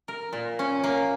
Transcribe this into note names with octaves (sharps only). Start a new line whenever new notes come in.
A#4
A#2
C#4
A#3